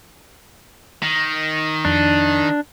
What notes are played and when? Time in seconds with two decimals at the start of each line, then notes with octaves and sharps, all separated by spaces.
1.03 D#3
1.85 F2 D4